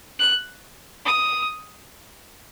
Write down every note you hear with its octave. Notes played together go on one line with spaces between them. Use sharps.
F#6
D#6